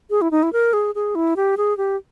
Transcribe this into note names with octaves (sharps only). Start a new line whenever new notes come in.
G#4
E4
D#4
E4
A#4
G#4
G#4
E4
G4
G#4
G4